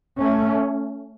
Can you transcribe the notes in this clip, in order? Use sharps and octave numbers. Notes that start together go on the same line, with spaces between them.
A3 C#4